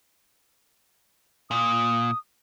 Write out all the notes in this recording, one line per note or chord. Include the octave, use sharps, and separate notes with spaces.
A#2 D#6